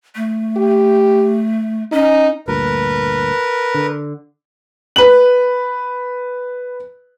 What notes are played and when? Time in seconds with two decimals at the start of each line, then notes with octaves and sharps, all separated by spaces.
0.16 A3
0.57 G4
1.92 C#4 D#4
2.48 D2 G2 A#2 A#4 B4
3.74 D3
4.96 B4 F#7